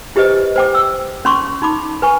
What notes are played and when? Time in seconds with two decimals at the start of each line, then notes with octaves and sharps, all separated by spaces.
0.16 E4 G4 B4 C5 D#5
0.56 C5 G5 D6
0.75 E6
1.25 C#4 C6 C#6
1.62 D#4 B5 D6
2.02 B4 G#5 C#6